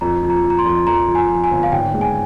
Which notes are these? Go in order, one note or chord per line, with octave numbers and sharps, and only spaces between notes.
F2 A#5
F3
A#5
F3
A#5
C6
F2
F2 A#5
F3
G#5
F2
G#5
G1
F5
G#1 G5
G#3
G#5